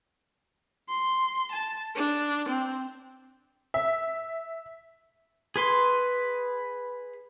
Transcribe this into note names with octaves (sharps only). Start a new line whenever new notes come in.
C6
A5
D4
C4
E5
G#4 B4 C6